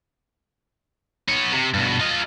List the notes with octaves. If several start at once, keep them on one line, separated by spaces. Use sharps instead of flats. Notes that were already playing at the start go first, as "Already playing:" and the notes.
B3 C#5
C3
G2 B2
F4 D#5